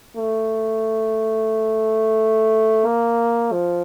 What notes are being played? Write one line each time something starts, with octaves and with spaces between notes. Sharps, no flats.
A3
A#3
F3